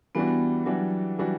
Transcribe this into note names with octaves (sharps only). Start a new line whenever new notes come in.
E3 G3 B3 D4 F#4
E3 F#3 G3 D4 F#4
E3 G3 D4 F#4